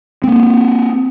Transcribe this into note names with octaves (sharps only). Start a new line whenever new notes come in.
A#3 C4